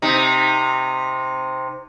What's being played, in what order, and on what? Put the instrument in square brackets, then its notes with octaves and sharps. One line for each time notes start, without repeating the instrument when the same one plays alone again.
[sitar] C3 D#4